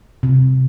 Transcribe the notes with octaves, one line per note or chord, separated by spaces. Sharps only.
C3